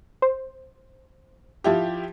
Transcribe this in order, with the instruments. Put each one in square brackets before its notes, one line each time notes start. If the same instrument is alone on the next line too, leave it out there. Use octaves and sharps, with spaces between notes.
[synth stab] C5
[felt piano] F3 E4 G4